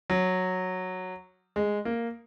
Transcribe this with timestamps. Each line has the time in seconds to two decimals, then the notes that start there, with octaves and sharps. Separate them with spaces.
0.10 F#3
1.56 G#3
1.85 A#3